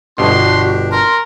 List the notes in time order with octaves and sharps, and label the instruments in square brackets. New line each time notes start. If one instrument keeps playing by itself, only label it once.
[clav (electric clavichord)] G1 B2 [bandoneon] D4 G4 [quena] F#4 [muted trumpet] C6
[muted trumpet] A#4 [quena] C6